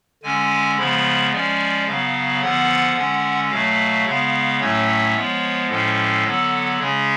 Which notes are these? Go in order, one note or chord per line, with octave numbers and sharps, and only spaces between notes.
D3 G#3 C#4 G#5
C#3 F3 G#3 B3 B5
F3 G#3 C#4 D5
C#3 F#3 B3 F5
D3 F3 B3 F#5
D3 G#3 C#4
B2 F#3 A3 F5
C#3 G#3 B3 F5
A2 F#3 A3 C#4 C#5
F3 G#3 B3
A2 F3 G#3 C#4 A4
D3 F#3 B3
C#3 G#3 C#4 G#4